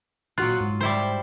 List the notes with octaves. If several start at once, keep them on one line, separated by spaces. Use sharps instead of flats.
A#2 F#3 F4 F#4 F#6
G#2
G3 E4 C5